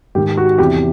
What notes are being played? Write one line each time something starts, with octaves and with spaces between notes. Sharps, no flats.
G#2 D#3 G4
F#4
E2 C3 E3 G4